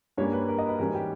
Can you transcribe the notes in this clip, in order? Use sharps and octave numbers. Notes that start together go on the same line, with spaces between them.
G2 G3 A#3 C#4 C#5
B4
A#4
D#5
B4
G#2 E3 G3 C#4 A#4
G4